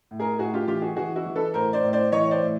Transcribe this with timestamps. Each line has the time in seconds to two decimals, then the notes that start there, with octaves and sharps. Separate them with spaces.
0.11 A2
0.20 G#4 A#4
0.39 A2 F#4 G#4
0.54 F4 G4
0.68 E3 F4 G4
0.82 F#4 G#4
0.96 E3 F#4 G#4
1.16 E4 F#4
1.26 E3
1.35 A4 B4
1.54 A2 A#4 C5
1.73 C5 D5
1.83 A2
1.93 C5 D5
2.12 E3 C#5 D#5
2.31 C5 D5
2.41 A2